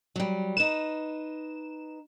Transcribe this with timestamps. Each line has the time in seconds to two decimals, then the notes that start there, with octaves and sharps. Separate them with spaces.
0.16 F#3 G3
0.57 D#4 B4 E7